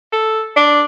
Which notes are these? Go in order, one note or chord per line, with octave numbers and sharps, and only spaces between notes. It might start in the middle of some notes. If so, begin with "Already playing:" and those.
A4
D4